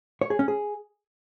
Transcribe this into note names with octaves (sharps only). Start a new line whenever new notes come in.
C#5
G#4
C#4
G#4